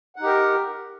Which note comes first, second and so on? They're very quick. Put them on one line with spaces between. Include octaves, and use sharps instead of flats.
F#5 D#4 G4 A#4